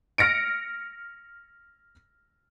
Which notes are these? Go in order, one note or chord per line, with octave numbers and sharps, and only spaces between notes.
F6 A#6 C#7 D7